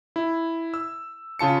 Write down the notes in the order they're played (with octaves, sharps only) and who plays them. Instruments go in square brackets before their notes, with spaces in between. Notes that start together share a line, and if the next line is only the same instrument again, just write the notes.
[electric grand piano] E4
E6
C#3 F4 A5 C#7